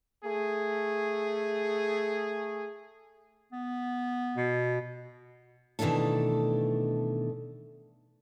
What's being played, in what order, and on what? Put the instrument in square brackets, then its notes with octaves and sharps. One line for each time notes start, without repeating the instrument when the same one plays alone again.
[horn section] A3 G#4
[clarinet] B3
[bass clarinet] B2
[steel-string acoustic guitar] B2 D#3 E3 A3 D4 A4